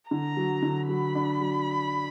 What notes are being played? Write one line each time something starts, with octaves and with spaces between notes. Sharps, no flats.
D3 A#5
F#3
D3
F#3 B5
D4
F#3